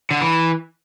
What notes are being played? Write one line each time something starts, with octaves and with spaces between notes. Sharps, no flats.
D3
E3